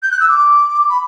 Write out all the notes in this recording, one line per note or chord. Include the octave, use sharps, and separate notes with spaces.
G6
F#6
E6
D6
B5